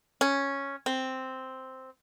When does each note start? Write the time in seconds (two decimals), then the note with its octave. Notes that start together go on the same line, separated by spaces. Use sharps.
0.21 C#4
0.86 C4